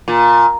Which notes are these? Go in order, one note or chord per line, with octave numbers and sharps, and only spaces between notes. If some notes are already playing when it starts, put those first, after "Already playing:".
A#2